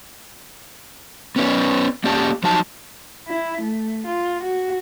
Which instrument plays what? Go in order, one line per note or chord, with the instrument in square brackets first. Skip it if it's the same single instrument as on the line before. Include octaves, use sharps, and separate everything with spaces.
[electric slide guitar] B3 C#4 B4 D5
A#3 C#4 G4 D5 A5
F3 F#3 D#4 A5
[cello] E4
A3
F4
F#4